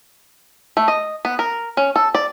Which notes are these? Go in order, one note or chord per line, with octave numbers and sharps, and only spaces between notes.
A3
D#5
B3
A#4
C#4
A4
D5